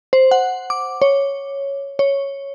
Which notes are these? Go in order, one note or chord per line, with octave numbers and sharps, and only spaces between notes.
C5
F#5
D6
C#5
C#5